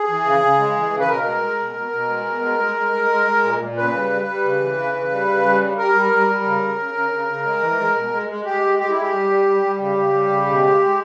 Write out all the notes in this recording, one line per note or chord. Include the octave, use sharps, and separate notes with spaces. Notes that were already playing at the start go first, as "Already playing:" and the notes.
Already playing: G#4
E3
C#3
C#3
G#3
E3
C#3
B4
B2 A#4
G#3
G#3
B2
B2
B2
G#3
B2
G#3
G#3
G#3
G#3
G#3
G#3
A#2
A#2
C#3 B4
G3
G3
G3
C#3
E3
C#3
C#3
G3
C#3
G3
G3
G3 A#4
G3
G3
G3
C#3
C#3
C#3
C#3
C#3
C#3
G#3
E3
G#3
B2
G#3
G#3
G#3 G4
G#3
G#3 G4
E4
G#3
G4
G3
G3
G3
G3
C#3 G4
C#3
G3
C#3
B2
G#3
G#3